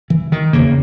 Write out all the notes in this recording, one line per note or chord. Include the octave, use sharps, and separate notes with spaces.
E3
D#3
E2 C#3 A#3